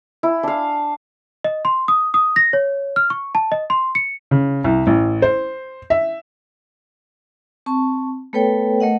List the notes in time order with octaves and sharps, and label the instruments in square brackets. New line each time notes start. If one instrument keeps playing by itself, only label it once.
[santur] E4
D4 F5
[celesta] D#5
C6
D#6
D#6
A#6
C#5
F6
C#6
A5
D#5
C6
C#7
[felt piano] C#3
C2
A1
C5
E5
[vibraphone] C4 A5 C#6
A3 B3 A4 B4 C#5 G5
A3 A#4 D#5 F#5